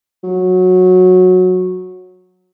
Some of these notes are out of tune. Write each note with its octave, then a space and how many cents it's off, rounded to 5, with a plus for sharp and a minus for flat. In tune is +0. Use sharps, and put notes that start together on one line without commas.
F#3 -15